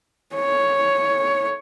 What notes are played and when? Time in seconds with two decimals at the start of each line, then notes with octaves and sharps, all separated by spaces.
0.36 C#5